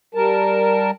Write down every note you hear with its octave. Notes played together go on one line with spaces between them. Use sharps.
G3 A#4 A5